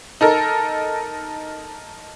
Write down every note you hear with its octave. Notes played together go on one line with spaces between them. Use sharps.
D#4 A4 A#4